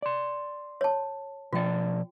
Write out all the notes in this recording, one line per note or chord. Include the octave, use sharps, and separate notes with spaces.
D5 C6
C#5 A5
B2 F3 F4 D5 G5